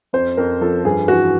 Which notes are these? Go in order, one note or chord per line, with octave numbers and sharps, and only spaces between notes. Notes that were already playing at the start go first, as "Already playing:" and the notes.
F2 C5
F2 A#4
F3 A4
G2 G#4
E3 F#4